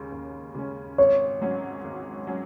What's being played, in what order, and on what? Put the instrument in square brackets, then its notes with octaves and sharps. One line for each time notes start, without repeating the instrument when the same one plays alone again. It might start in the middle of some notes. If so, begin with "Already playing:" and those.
Already playing: [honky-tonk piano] D#2 C#3 G#3 C#4
D#2
C#3 G#3 C#4
[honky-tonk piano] G#1 [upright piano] C#5
[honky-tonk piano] G#2 F#3 C#4
G#1
F#3 C#4